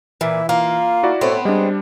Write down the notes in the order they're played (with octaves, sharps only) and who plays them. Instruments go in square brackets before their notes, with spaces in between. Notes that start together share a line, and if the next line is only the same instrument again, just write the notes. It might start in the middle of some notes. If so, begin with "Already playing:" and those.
[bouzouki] A#2 [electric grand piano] E3 [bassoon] E4
[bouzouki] A#3 [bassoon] F4
[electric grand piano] E4 F#4 D5
[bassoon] A2 [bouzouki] B3 C4
[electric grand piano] G3 D4 [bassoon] G#3